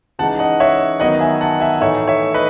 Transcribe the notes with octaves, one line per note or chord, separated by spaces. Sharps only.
C#3 E3 G#3 D#4 F#5 A5
D#5 F#5
C#5 E5
D#3 F#3 B3 D#5 F#5
E5 G#5
F#5 A5
E5 G#5
A2 E3 A3 D#4 C#5 E5
C#5 E5
B4 D#5